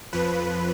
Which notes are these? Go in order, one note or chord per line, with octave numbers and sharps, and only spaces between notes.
F2 F3 B4